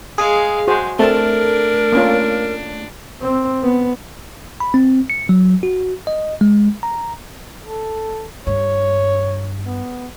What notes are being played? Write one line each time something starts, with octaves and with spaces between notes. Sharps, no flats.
G#3 G#4 F5
G#3 F#4 C5
A3 C4 D4 A#4 A5
A#3 C#4 F4
C4
B3
B5
C4
C#7
F#3
F#4
D#5
G#3
A#5
A4
G2 C#5
B3